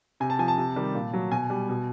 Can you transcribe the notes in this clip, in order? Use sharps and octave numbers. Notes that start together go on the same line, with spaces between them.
C3 G#5
A5
F3 G#5
A5
C3
D#3 G3
A#2
F#3
B2 G#5
G3
B2